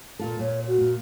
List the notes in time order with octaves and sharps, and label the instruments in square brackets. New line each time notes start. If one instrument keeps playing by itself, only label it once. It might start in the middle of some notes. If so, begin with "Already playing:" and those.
[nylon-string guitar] A#2 F4 A4
[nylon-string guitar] A#2 [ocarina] C#5
[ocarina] F#4
[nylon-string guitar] A#2